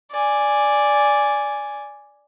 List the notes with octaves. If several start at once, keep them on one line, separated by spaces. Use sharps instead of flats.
D5 G#5